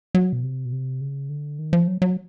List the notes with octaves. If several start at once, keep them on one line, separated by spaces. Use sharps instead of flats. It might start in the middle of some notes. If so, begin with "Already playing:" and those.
F#3
B2
C3
B2
C3
C#3
D3
D#3
F3
F#3
F#3